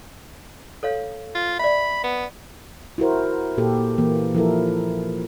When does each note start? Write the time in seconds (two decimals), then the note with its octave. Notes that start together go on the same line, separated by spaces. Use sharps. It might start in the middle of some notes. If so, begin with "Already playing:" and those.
0.83 A4 C#5 F5
1.35 F4
1.59 D5 E5 B5
2.04 B3
2.98 E4 F#4 A#4 C5
3.57 A#2 A#3 G4 A4
3.98 E3 A#3
4.35 F3 E4 A4 A#4